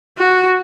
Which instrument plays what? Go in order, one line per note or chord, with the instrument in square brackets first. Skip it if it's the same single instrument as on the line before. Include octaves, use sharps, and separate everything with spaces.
[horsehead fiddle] F#4